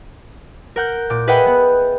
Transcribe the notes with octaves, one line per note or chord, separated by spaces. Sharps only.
A#4 F#5 G6
A#2 D6
G#4 B4 D#5 E5 F#5 G5
B3